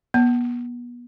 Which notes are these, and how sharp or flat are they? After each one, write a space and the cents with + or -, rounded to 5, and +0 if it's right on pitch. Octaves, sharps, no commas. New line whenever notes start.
B3 -30 A5 +0